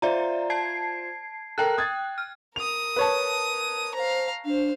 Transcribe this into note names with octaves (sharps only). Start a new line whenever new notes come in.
F4 C5 D5 E5 A#5
A5 G#6 C7
A4 A#4 G5 F#6
D#6 G#6 A6
F6
A#4 D#6 F7
B4 C#5 A5
C5 F5 A#5
D4 C5 F5